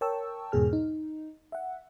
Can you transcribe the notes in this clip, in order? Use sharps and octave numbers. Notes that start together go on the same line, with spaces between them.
A#4 C#5 G5 A5 C#6 E6
E2 G#2 B2 G#4 F6
D#4
E5 F#5